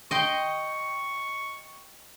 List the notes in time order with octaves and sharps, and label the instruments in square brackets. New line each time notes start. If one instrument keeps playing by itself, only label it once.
[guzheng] D#5 G5 C6 [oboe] C#6